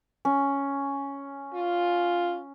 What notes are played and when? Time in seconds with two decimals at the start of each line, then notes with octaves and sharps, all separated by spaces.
0.25 C#4
1.54 F4